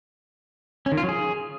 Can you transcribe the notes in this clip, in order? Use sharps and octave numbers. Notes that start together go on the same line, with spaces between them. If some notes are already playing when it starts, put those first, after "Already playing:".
C#4
D#3
F4
F#3
G#4